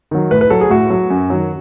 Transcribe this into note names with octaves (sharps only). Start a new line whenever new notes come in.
D#3 F#3
A2 B4
B4
F#3 A4
G#4
A2 F#4
F#3
F#2
D#3 F#3